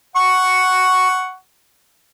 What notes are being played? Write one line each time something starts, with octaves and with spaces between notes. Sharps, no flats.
F#5 C#6